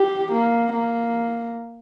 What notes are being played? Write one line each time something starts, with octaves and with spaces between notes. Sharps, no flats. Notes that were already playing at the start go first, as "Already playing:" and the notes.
Already playing: G4
A#3
A#3